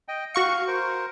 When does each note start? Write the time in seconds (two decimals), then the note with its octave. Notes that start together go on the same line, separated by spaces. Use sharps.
0.08 D#5 G5
0.34 F#4 F5 C#6 C#7
0.67 A#4 C5